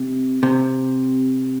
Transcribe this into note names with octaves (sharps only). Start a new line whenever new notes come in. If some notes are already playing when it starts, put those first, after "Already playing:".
Already playing: C3
C3